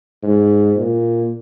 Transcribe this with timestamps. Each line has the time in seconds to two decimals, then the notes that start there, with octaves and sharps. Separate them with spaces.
0.23 G#2
0.77 A#2